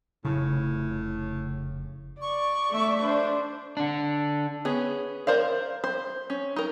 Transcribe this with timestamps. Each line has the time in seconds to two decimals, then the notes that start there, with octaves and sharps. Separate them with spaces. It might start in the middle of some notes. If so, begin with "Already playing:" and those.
0.25 F1 A2 C#3
2.22 D5 C#6
2.71 A3 E5
3.03 D4 C5
3.77 D3 D4
4.65 B3 C#4 G#4
5.27 A#4 C5 D5 F5
5.84 C5
6.30 C#4
6.56 D#4 A#4